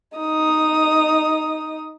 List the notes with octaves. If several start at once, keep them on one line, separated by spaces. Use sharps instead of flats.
D#4 D#6